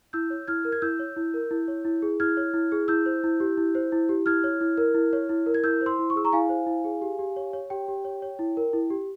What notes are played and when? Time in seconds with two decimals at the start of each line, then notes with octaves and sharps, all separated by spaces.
0.13 E4 E6 G6
0.30 C#5
0.47 E4 F6 G#6
0.65 A#4
0.72 G#6
0.82 E4 E6 G6
0.99 C#5
1.17 E4
1.34 A#4
1.51 E4
1.68 C#5
1.85 E4
2.02 G#4
2.20 E4 F6 G#6
2.37 C#5
2.54 E4
2.72 G#4
2.88 E4 E6 G6
3.06 C5
3.24 E4
3.40 G4
3.57 E4
3.75 C5
3.92 E4
4.09 G4
4.26 E4 F6 G#6
4.44 C#5
4.61 E4
4.78 A#4
4.94 E4
5.13 C#5
5.29 E4
5.46 A#4
5.54 G#6
5.64 E4 E6 G6
5.81 C5
5.86 C6 E6
5.99 E4
6.10 C#6
6.16 G#4 E6
6.25 A#5 C#6
6.33 E4 F5 G#5
6.49 C5
6.67 E4
6.84 G#4
7.02 G4
7.19 G4
7.36 C#5
7.53 C#5
7.70 G4 G5
7.88 G4
8.05 C#5
8.22 C#5
8.39 E4
8.57 A#4
8.73 E4
8.90 G4